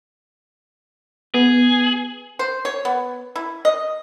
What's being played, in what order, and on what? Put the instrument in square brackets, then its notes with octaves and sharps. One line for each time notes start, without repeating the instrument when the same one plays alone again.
[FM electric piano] B3 [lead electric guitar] G#4
[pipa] C5
C#5
B3
E4
D#5